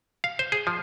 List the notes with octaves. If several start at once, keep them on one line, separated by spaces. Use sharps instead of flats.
F5
C5
G#4
F3